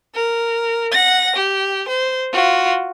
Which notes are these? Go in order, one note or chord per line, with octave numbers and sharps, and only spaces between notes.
A#4
F#5 A#6
G4
C5
F4 F#4